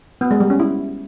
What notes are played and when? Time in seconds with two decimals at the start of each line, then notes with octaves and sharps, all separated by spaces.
0.21 B3
0.31 G#3
0.40 G3
0.50 C#4
0.60 E4